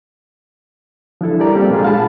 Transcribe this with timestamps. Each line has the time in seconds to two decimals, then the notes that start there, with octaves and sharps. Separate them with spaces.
1.21 F3 D4 E4 A4
1.39 G3 G4 A#4 D5 A#5
1.55 G3 A#3 C4 F4 G4 A4
1.70 A#2 G#3 D4 F4 G#4
1.84 F5 F#5 A5 B5